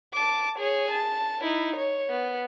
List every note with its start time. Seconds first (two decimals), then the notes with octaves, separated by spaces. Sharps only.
0.14 A5 D6
0.58 G#4 C#5
0.91 A5
1.42 D#4 E4
1.76 C#5
2.09 B3